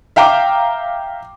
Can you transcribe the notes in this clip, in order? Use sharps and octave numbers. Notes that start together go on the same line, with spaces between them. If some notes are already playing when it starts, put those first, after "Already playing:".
E5 F5 G5 A#5 D6